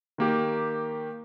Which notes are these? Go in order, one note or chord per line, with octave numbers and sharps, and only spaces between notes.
D#3 A#3 G4